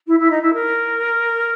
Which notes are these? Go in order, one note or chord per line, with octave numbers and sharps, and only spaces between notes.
E4
E4
D#4
E4
A#4